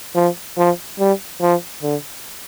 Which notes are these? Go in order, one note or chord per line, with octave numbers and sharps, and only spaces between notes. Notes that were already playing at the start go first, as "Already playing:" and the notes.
F3
F3
G3
F3
D3